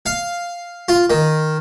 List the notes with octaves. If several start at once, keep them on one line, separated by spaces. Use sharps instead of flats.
F5
F4
D#3